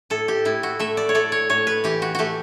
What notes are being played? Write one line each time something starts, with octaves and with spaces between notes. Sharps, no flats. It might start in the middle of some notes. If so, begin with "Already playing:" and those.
A2 A4
G4
A2 E4
F#4
A3 E5
D5
C#5
A3 D5
C#5
A2 C#5
B4
E3 G4
F#4
A3 F#4 G4